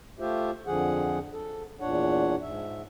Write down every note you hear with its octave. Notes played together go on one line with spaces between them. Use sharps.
A3 F4 G4 C5 E5
F2 D3 F3 G#4 F#5
A4
E2 A#2 D4 C#5 F#5
G#2 E5